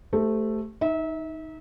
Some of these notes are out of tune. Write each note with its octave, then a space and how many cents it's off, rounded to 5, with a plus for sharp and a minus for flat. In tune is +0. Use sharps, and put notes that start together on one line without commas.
A3 +0 G4 +0 C5 -20
D#4 +10 E5 -30